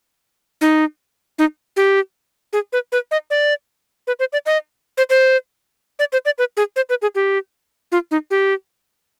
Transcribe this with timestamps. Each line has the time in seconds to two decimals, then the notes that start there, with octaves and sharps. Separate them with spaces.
0.61 D#4
1.39 D#4
1.76 G4
2.53 G#4
2.73 B4
2.92 B4
3.11 D#5
3.30 D5
4.07 B4
4.19 C5
4.33 D5
4.46 D#5
4.98 C5
5.10 C5
5.99 D5
6.13 C5
6.25 D5
6.38 B4
6.57 G#4
6.76 C5
6.89 B4
7.02 G#4
7.15 G4
7.92 F4
8.11 D#4
8.31 G4